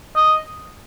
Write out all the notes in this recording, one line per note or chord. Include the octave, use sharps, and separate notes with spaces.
D#5